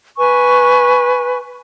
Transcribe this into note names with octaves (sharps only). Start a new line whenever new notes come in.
B4 G#5 C#6